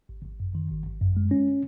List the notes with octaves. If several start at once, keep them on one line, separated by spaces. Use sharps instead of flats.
G#1
G#1
F#2
D#3
G#1
G#1
F#2
G#3
C#4